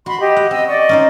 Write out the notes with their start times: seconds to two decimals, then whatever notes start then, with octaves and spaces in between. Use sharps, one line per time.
0.06 F#4 B5 C6
0.20 G4 D#5
0.37 F#5
0.51 C4 D#5 E6
0.67 D5 D#5 C#6
0.89 C#4 D#4 C5